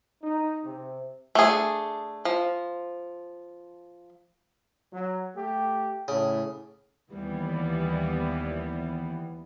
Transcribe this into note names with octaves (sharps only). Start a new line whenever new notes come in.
D#4
C3
A3 D4 G#4
F3
F#3
A3 G4
A2 C#3
D#2 E3 G3 B3